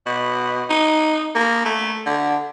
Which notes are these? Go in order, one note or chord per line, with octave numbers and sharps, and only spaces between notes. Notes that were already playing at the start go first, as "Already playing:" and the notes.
B2
D#4
A#3
A3
D3